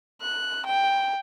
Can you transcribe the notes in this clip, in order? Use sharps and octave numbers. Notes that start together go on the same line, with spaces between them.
F#6
G5